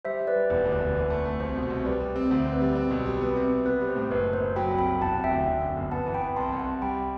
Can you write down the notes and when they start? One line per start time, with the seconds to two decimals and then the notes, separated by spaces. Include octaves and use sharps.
0.05 G3 C5 E5
0.20 G3
0.27 B4 D5
0.35 G3
0.50 E1 B4 D5
0.65 D2
0.72 B4 D5
0.80 D2
0.95 E3
1.10 A3
1.25 A3
1.40 C2 C5
1.56 B2
1.63 C5
1.70 C2
1.85 G3 B4 D5
2.00 G3
2.16 C4
2.30 D2 C5 E5
2.46 C4
2.53 B4 D5
2.61 G3
2.75 C4
2.91 B1
3.06 G3
3.21 B3
3.36 C3
3.51 C3
3.66 B3 B4
3.81 G3
3.89 C5
3.96 A2
4.11 F#1 B4
4.26 F#1
4.33 C5
4.41 F#1
4.56 F#3 G5 B5
4.71 C2
4.78 G5 B5
4.86 F#3
5.01 E1 F#5 A5
5.16 C3
5.24 E5 G5
5.31 D2
5.46 D3
5.61 F#2
5.76 G1
5.91 B3 F#5 A5
6.06 E3
6.14 G5 B5
6.21 B3
6.36 C2 A5 C6
6.52 C2
6.59 F#5 A5
6.67 C2
6.82 G3 G5 B5